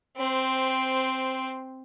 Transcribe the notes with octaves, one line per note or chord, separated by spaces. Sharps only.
C4 C5